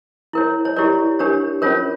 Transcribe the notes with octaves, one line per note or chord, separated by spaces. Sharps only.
E4 A#4 C#5
C#5
E4 G4 A#4 C#5 D5
D4 G4 A#4 C#5
C#4 F4 A#4 C#5